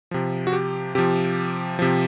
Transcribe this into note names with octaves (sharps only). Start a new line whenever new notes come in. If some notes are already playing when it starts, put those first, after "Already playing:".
C3 F3
F#4
G4
C3 F3 G4
C3 F3